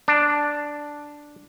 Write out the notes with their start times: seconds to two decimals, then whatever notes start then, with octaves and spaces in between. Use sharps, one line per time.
0.08 D4